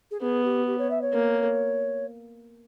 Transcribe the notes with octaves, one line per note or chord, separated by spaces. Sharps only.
G#4
B3 G#4
G4
G4
C#5
E5
C#5
A#3